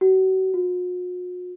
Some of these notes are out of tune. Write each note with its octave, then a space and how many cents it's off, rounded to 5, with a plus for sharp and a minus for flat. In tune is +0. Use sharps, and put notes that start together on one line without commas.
F#4 +35
F#4 -45